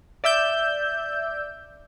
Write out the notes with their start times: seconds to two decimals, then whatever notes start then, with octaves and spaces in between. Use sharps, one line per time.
0.24 D5 E5 E6 G6